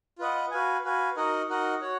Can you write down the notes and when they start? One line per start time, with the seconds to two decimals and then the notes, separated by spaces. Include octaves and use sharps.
0.19 F4 B4 D#5 F#5
0.51 F#4 B4 F5 G#5
0.84 F#4 B4 F5 G#5
1.16 D#4 F#4 A#4 D#5 F#5
1.49 D#4 F#4 A#4 D#5 F#5
1.81 F#4 C#5 F#5